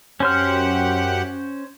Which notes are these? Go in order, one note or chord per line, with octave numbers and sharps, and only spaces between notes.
F#2 C#4 G4 C5 F#5 F6